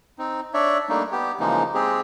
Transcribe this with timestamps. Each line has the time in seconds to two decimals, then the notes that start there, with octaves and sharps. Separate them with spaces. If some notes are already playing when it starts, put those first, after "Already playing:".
0.18 C4 D#4
0.54 D4 C#5 D5 E5
0.89 G3 A3 A#3 D4 D#4
1.12 B3 G4
1.40 C#3 E3 F3 G#3 A#3 D#4
1.74 G#3 C4 G4 G#4